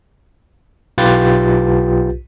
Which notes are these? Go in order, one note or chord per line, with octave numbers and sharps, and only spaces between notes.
B1 F4 G4 B4 G6 A6